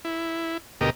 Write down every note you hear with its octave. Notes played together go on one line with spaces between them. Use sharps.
E4
D2 B2 G4 A#4 D#5